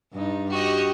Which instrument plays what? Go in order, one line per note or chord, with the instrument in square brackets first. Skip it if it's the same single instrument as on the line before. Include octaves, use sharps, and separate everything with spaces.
[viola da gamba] G2 D#4
[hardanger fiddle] F#4 D#5 [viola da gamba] G4